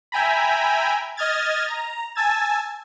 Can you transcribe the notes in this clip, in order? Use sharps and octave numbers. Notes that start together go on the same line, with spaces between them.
E5 G5 G#5 A#5 B5
D#5 D#6 F6 G#6 A6
A#5
G#5 A5 E6 G#6 A6